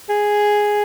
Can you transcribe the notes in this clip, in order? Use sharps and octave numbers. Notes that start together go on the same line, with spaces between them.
G#4